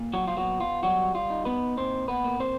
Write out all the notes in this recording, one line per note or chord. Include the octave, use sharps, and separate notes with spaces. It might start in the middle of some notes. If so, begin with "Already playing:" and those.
Already playing: A#2
F#3 F#4
F4
F#3 B3 F#4
F4
F#3 G3 F#4
F4
D#4
B3 B4
A#2 C4 C5
B3 B4
A#3
C4 C5